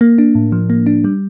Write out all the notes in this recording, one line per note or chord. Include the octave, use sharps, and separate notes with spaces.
A#3
D4
A2
F3
A#3
D4
G3